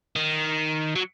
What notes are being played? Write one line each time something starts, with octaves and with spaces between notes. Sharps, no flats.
D#3
F#3